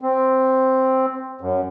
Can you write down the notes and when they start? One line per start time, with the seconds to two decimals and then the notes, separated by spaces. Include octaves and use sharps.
0.01 C4
1.41 F#2